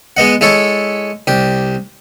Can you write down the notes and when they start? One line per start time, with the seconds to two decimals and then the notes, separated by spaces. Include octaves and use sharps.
0.17 G#3 B3 D#5 F#5
0.41 G#3 E4 A4 C#5
1.27 C2 G4